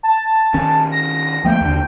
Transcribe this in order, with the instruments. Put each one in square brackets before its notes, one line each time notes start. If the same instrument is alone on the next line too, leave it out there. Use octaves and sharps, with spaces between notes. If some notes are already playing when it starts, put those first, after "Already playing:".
[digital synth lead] A5
[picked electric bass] D#3 C#4
[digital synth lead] A#6
[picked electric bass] F3 A3 A#3 [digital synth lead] G5
[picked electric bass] D#2 D3